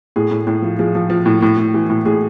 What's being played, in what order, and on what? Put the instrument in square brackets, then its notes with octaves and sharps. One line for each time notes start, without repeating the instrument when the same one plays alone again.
[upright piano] A2 G#4
A2
A2
F3
F3 G#4
F3
F3
A2
A2
A2
E3
A2
A2 G#4